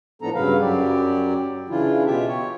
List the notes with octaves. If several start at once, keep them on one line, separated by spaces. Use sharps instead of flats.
A2 F3 B3 D4 A4 A#5
G2 C#3 F#3 B4 F5
F#2 F#3 G4 D5
C#3 E3 D4 E4 F4
B2 F4 G4 E5
C#5